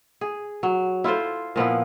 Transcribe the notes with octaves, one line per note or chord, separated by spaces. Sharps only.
G#4
F#3
E4 F4 A4 C5
A#2 F3 B3 E4